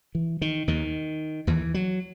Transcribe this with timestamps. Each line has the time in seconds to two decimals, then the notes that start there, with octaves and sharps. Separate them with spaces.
0.15 E3
0.42 D#3
0.68 D#2 D#3
1.47 D#2 E3
1.74 F#3